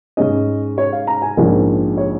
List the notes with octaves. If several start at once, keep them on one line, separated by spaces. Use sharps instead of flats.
G#2 G#3 C#4 D#5
C#5
F5
A#5
G#5
A#1 G#2 F3 G#3 C#4 A#4
C#5